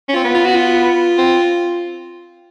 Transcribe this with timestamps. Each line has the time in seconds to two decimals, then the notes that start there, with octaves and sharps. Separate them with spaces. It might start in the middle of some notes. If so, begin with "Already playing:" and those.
0.09 C#4
0.13 C4 F4
0.24 B3
0.35 F4
0.45 F#4
0.56 F4
1.18 C4